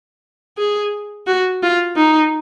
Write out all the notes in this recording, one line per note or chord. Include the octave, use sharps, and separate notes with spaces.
G#4
F#4
F4
D#4